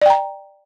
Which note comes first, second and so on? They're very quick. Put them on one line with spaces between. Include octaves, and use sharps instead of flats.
D5 G5 A#5